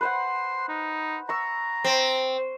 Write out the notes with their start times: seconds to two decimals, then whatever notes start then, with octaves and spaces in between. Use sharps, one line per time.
0.01 B4 C5 F#5 C6
0.68 D#4
1.29 A#5 C#6 E6
1.84 C4